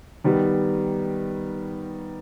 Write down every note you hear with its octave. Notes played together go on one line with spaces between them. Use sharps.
D#3 G3 B3